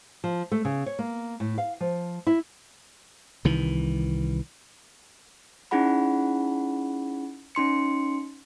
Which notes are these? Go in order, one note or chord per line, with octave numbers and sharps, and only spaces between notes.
F3
A3
C#3
C#5
A#3
A2
F5
F3
E4
C2 D#3 E3
C#4 D#4 E4 G#4 F#5 B5
C#4 D#4 C6 C#7